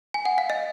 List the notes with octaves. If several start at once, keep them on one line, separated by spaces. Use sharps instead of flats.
G#5
F#5
F5
D#5